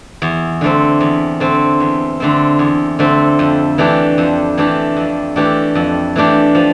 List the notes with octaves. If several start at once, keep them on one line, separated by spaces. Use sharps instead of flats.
E2
D3 A3 C4
E2
D3 A3 C4
E2
D3 A3 C4
E2
D3 A3 C4
F2
E3 A3 D4 G4
F2
E3 A3 D4 G4
F2
E3 A3 D4 G4
F2
E3 A3 D4 G4
F3